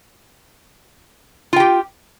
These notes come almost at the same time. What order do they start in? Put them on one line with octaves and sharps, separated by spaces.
F4 G5 G4